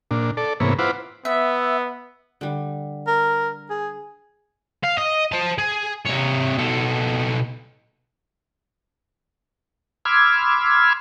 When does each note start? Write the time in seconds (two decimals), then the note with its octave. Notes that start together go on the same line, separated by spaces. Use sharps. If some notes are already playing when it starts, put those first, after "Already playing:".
0.11 A#2 D4
0.37 A4 D5
0.60 G#2 C3 E3 A#3 B3 C#5
0.79 E4 F4 B4 C5 F#5 D6
1.25 B3 E5
2.41 D3 G3
3.07 A#4
3.70 G#4
4.84 F5
4.98 D#5
5.32 C5 A5
5.58 G#4
6.05 C3 C#5
6.58 B2 A4
10.05 B5 C6 D6 E6 F6 G#6